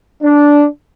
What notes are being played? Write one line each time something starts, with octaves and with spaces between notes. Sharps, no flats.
D4